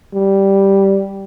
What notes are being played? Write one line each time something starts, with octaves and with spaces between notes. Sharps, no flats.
G3